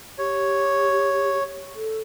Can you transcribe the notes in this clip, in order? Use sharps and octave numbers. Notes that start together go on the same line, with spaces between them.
G4 C#5
A4